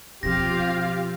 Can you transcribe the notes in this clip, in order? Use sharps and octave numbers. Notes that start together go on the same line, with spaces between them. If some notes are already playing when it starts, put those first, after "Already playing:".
B2 F3 C4 F4 G4 F5 A#6